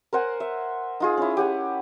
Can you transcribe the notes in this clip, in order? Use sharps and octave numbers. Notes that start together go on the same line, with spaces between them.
A#4 C5 F#5 G#5
E5
D#4 F4 G#4
C#4 E4
G4 F#5 G#5